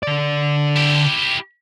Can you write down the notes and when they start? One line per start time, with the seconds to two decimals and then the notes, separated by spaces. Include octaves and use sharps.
0.03 D3 D5
0.76 E4 G4